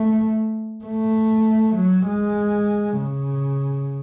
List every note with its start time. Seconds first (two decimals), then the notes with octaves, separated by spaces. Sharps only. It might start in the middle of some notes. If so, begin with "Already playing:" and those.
Already playing: A3
0.85 A3
1.76 F#3
2.06 G#3
2.98 C#3